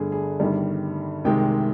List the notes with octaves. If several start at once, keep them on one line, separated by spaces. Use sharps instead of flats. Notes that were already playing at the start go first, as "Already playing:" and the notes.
Already playing: G1 G2 D3 G#4
G#4
G1 G2 D#3 G3
C2 C3 D#3 G#3 G5